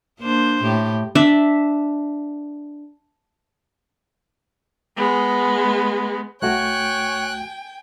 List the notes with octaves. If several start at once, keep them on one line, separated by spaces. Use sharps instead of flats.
A#3 D4 C5
A2 G4
D4 E5
G#3 B3
C2 A3 F#4 C#5 G5 G#5 F#6